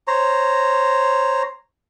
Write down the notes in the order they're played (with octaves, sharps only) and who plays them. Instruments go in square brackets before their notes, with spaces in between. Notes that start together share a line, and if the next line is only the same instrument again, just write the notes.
[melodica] C5 C#5 A#5